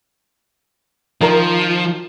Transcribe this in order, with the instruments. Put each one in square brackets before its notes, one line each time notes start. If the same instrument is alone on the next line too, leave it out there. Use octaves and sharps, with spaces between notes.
[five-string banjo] D#3 A#4 A#5 [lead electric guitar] F3